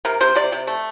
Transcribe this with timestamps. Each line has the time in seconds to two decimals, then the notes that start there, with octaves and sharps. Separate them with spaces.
0.05 C3 A#4
0.21 C3 C5
0.36 C3 D5
0.52 C3
0.67 A3